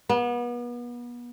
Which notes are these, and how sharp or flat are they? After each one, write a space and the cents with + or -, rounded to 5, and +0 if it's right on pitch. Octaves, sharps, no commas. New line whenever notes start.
B3 -35